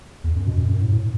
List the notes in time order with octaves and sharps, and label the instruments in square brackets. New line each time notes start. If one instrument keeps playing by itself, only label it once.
[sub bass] E2
F#2
B2
F#2
F#2
A2
A2